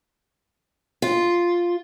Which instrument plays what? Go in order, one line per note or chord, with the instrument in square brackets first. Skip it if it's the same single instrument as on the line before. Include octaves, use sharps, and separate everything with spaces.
[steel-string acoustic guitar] F4